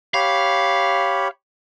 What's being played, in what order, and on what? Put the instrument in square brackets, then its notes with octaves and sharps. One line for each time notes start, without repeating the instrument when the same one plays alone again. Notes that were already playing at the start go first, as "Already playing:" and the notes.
[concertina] G4 C#5 B5 [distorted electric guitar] F5